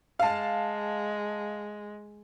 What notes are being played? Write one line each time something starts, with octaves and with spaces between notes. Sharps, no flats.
G#3 F5 A5